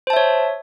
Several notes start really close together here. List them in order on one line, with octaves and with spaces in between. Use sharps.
C5 A5 E5 C#5